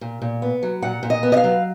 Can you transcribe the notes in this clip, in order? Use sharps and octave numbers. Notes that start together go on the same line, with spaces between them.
A#2
A#2
B3
F#3
A#2 F#5
A#2
D#5
B3
D#5
F5
F#3